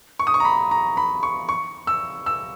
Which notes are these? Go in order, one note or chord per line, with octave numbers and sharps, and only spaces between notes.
C#6
D#6
C#6
A#5
B5
A#5
B5
C#6
C#6
E6
E6